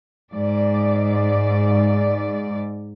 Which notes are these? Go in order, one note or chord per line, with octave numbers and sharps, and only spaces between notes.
G#2 D5